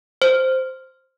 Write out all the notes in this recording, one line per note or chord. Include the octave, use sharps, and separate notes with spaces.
C5